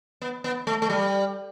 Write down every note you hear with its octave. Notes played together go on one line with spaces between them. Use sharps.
B3
B3
A3
A3
G3